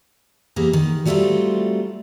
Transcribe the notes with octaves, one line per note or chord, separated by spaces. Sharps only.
E3 A#3 B3 G4 G#4
D#3
F#3 G3 A3 B3 C4 F4